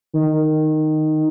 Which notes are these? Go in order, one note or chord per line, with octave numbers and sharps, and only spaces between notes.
D#3